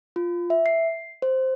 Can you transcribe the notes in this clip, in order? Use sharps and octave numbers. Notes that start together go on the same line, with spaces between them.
F4
E5
C7
C5